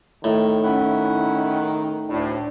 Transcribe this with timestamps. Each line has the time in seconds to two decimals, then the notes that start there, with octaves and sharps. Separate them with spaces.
0.24 A2 D#3
0.64 C#4 E4 F#5
2.09 D2 A2 D4